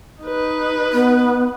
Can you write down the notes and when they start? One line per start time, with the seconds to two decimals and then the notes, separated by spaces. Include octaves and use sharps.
0.22 D#4 B4
0.93 B3